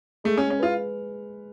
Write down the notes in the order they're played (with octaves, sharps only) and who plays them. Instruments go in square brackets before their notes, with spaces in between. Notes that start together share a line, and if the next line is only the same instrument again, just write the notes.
[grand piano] G#3 [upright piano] A3
[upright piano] C#4
[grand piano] G#3
[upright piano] C#4
[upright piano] F4 [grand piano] B4